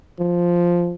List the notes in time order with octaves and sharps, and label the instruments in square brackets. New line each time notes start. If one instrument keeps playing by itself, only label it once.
[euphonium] F3